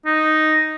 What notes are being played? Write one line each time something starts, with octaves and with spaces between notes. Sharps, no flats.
D#4